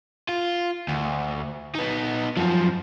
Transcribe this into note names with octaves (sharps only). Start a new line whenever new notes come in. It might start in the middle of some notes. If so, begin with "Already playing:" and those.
F4
D2
B3 D#4
F#2 F3